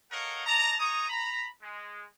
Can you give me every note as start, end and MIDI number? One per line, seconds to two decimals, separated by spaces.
0.11 0.44 69
0.11 0.44 70
0.11 0.44 73
0.11 0.44 75
0.11 0.44 77
0.11 0.44 78
0.46 0.73 74
0.46 0.73 75
0.46 0.73 81
0.46 0.73 82
0.80 1.07 63
0.80 1.07 73
0.80 1.07 82
0.80 1.07 87
1.09 1.47 82
1.09 1.47 83
1.62 2.04 56